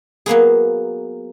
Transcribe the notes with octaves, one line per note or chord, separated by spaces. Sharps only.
F#3 A#3 B3 G#4